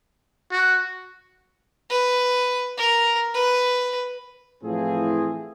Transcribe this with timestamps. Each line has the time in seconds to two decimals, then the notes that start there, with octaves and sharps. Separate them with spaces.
0.52 F#4
1.90 B4
2.78 A#4
3.34 B4
4.64 A2 E3 F3 C4 G#4